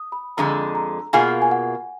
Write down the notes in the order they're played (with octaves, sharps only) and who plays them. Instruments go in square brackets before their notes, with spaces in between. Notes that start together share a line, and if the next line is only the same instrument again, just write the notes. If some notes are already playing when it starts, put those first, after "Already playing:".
Already playing: [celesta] D#6
B5
[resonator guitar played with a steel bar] F2 D3 G#3 [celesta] A#5
[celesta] A#5
[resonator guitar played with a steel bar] B2 A#3 F4 G#4 [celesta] G#5
[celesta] G#5
F#5